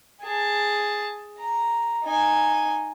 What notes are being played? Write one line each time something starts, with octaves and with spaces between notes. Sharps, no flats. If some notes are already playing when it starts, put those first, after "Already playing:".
G#4 A5
A#5
D#4 G#5